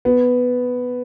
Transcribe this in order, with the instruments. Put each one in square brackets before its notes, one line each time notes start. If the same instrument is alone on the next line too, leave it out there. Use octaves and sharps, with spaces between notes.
[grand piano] B3